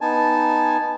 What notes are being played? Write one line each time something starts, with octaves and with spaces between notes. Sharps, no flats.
B3 D#4 G#5 A5